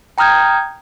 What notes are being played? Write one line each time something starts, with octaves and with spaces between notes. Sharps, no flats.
G5 A#5 D#6 F6 G6 G#6